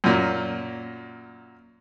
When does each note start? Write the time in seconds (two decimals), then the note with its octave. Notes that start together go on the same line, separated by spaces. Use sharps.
0.04 F#2 A#2